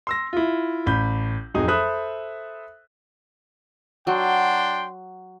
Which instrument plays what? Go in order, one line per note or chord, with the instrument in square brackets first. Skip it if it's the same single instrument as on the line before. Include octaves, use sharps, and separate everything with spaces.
[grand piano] C6 E6 A#6
E4 F4
A1 B5 G6
D1 F2 F#3 D#4 G#4 D#6
A4 C5 E5 B5 D#6 F#6
[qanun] F#3 [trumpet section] D4 G5 C6